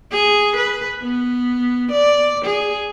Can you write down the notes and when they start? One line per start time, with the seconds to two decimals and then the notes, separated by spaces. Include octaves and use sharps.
0.12 G#4
0.57 B4
1.03 B3
1.92 D5
2.45 G#4